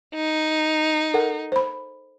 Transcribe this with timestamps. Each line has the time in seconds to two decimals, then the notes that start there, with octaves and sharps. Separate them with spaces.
0.15 D#4
1.14 A4 A#4 F#5
1.52 C5 B5